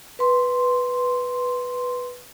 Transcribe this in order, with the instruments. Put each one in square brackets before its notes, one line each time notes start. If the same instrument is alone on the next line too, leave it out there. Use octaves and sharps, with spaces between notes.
[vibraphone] B4 C6